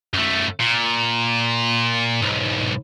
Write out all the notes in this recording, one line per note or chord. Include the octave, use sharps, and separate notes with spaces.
F#2 A3
A#2
B1 G#2